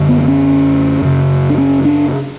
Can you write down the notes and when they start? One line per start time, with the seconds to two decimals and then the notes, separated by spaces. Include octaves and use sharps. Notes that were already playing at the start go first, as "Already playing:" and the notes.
Already playing: F#2 D3
0.09 B3
0.21 B3
0.28 C#4
1.02 F#2 C#3
1.50 D4
1.58 C#4
1.85 D4